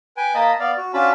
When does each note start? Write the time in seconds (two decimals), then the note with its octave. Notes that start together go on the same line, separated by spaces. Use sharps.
0.17 B4 G5 G#5
0.34 A#3 D#5 A5 B5
0.60 B3 D5 F5
0.77 F#4
0.94 C#4 D4 F4 F#4 A5 B5